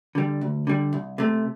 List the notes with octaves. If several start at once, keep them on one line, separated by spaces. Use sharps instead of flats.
D3 G3
D2
D3 G3
C2
C3 A3